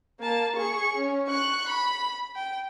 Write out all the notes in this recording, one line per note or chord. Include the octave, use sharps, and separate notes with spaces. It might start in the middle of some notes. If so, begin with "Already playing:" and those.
A#3 A5
G#4 C#6
C#4
C#6 F#6
B5
G5